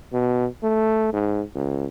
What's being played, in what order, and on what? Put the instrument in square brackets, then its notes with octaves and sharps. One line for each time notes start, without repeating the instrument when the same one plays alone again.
[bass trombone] B2
A3
G#2
C#2